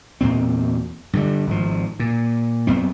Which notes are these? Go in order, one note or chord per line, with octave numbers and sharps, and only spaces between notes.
E2 A#2 C4
G2 D3 G3
G#1 F3
A#2
F#2 B3 C4